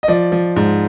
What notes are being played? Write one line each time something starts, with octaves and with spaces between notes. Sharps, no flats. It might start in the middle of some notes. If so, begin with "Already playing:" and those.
D#5
F3 D5
F3
G#2